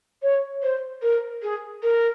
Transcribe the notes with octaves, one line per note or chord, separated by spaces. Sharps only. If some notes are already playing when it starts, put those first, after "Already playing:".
C#5
C5
A#4
G#4
A#4